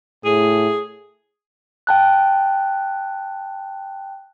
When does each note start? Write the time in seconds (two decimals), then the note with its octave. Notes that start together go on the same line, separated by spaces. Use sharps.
0.25 A2 G#4
1.87 G5 A5 F#6